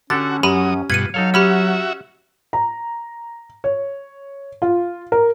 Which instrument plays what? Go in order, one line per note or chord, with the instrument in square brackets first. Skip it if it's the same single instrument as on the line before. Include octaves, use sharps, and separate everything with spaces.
[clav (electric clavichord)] D3 G4 A4 [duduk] C#4 [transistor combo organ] F#4 [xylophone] A6
[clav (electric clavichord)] F#2 [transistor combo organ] F#3 D#6 [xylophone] G4 B5 D#7
[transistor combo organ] G2 B2 [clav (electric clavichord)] F4 B4 [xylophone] G#6 C#7 D#7
[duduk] F#3 [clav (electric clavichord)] D#4 A4 C#5 [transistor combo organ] F5
[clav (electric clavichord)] C#4 [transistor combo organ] F#4 E5 [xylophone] G4 B5 E6
[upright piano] A#5
C#5
F4
A#4